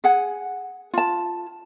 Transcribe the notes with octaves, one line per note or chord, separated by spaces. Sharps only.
G#4 F#5 G#5
F4 A5